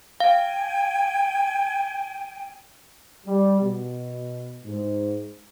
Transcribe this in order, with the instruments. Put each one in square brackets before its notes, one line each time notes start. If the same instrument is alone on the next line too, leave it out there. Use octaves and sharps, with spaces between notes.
[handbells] F5 [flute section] G5 G#5
[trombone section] G3
B2
G#2